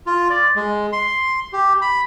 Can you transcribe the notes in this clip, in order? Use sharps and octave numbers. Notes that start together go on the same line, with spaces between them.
F4
D5
G#3
C6
G4
B5